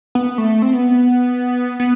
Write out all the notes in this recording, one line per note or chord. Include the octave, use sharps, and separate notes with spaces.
B3
A3
C4
B3
B3